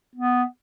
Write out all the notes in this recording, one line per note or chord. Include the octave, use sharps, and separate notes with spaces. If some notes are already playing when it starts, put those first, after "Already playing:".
B3